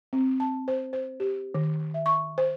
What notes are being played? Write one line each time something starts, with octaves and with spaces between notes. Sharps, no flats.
C4
A5
C5
C5
G4
D#3
E5
C#6
C5